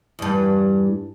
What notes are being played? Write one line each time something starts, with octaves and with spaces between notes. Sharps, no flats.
E2 G2